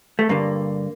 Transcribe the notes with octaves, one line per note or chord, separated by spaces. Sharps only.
A3
G2 D3 A#3